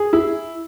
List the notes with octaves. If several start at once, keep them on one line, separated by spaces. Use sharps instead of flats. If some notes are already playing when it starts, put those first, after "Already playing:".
Already playing: G#4
E4